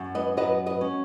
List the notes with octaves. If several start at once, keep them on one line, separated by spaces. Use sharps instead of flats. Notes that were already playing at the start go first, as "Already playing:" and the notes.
Already playing: F#2
B4 D#5
F#3 B4 D#5
B4 D#5
C#4